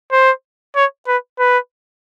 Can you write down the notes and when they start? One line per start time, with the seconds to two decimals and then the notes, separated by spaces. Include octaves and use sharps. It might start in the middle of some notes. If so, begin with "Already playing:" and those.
0.12 C5
0.76 C#5
1.07 B4
1.39 B4